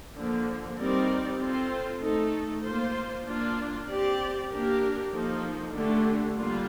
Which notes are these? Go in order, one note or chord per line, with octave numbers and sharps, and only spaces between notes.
D3 F3 A#3
G3 C4 D#4 A#4 D5
C4 F4 A4 C5
A3 D#4 A4
A#3 F4 C5
A#3 D4 F4
C4 G4 D5
A#3 D4 G4 A#4
F3 A#3 D#4 A4
D3 A3 D4 G4
D3 G3 A#3 D4 F4